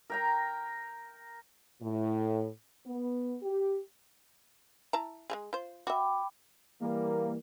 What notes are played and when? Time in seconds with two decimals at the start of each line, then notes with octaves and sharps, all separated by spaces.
0.10 A#4 G5 A#5
1.81 A2
2.86 B3
3.43 G4
4.93 E4 A5 A#5
5.30 G#3 A3 G#4
5.53 F4 C5
5.87 F#4 E5 G5 B5 D6
6.81 E3 G3 A#3